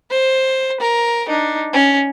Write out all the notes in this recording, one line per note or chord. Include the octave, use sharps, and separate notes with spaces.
C5
A#4
D4 D#4
C#4